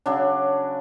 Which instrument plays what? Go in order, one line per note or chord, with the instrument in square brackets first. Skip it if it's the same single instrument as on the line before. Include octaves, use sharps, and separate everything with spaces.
[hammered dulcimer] C#3 F#3 D4